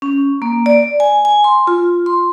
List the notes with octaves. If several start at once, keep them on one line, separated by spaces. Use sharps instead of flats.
C#4
A#3
D5
G#5
G#5
C6
F4
C6